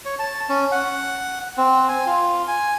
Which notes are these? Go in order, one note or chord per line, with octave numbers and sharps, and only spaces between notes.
C#5
A5
C#4
F#5
C4
G#5
F4
G#5